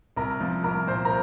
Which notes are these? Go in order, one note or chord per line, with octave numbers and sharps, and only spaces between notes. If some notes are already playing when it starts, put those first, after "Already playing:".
C2 A#4 A#5
F3
C2 A#4 A#5
A#2 C5 C6
A#4 A#5